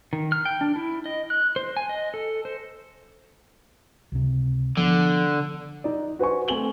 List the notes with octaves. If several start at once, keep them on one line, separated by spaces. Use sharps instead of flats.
D#3
F6
G5
D4
E4
D#5
F#6
C5
G#5
D#5
A4
C5
C#2 C3
D3 F3 B3
D#4 D5
F#4 B4 C5 G#5 C#6
A3 C4 A4 G#5 F#7 G7